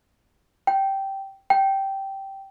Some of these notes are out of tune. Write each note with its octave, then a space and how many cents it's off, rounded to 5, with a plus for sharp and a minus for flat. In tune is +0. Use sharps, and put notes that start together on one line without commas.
G5 -10
G5 -10